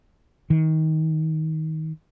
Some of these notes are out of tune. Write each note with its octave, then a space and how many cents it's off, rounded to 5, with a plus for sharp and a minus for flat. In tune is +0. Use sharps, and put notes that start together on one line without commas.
D#3 +20